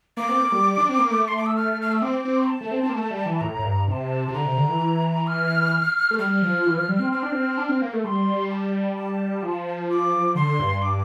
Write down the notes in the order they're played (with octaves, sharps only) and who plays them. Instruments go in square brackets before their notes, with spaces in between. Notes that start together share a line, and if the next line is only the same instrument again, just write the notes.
[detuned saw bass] A#3 [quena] D6
[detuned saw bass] C4
A#3
G3
D4
C4
A#3
A3
[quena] C6
D6
E6
F6
F6
E6
[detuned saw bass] C4 [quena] D6
[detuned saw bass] C4
[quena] A5
[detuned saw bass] A3
C4
C4
A#3
A3
G3
E3
[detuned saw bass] A2 [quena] A#5
[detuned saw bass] A2
G2
[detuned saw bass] C3 [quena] A5 A#5
[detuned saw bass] C3
[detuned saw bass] D3 [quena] A#5
[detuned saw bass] C3
D3
E3
[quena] F6
[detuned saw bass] A3
[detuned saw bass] G3 [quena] F6
[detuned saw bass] F3
E3
F3
G3
C4
[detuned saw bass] C4 [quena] F6
[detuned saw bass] D4
C4
D4
C4
A#3
A3
[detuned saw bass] G3 [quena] C6
[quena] A5
A5
[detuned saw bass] F3
[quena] D6
[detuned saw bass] D3 [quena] C6
[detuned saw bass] G2
[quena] D6